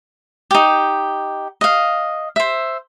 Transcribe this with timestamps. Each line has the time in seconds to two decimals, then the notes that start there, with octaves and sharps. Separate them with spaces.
0.51 D#4 G4
1.61 D#5 F5
2.36 C5 E5